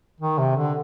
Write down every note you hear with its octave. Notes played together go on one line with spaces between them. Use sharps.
D#3
C3
D3